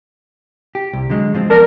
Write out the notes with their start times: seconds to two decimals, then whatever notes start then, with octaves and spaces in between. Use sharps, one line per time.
0.75 G4
0.93 C2
1.10 D3 F#3 G#3
1.35 F3 G#3 C4
1.50 B3 A#4 D5 A5